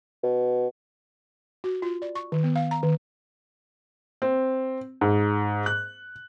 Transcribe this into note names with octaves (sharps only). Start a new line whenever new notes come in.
B2
F#4
F4
D5
C#6
D#3
B3
F5
A#5
D#3
C4
G#2
F#6